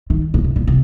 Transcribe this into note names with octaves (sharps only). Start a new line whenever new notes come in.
D#3
A#2
C3
A#2
C3